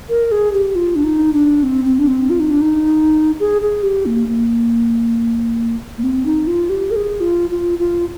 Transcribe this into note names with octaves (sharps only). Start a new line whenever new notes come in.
A#4
G#4
G4
F4
D4
D#4
D4
C4
C4
D4
C4
F4
D#4
D4
D#4
G#4
G#4
G4
A#3
A#3
A#3
C4
D#4
F4
G4
A#4
G#4
F4
F4
F4